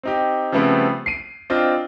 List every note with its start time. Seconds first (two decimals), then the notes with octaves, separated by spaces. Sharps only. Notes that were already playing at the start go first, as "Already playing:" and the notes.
0.03 C4 D#4 G4
0.52 C#3 F3 G3 A3 B3 C4
1.06 C7 D7 D#7
1.50 C4 D4 F4 D#5